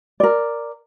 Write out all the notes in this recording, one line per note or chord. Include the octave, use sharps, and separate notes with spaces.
A#4 D5